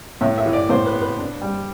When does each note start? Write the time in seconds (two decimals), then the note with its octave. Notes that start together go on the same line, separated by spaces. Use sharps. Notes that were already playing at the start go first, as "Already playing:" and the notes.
0.21 A2 E5
0.38 E5
0.46 E3
0.53 D5
0.69 A2 C5
0.86 B4
0.93 B3
1.02 B4
1.18 D4
1.42 G3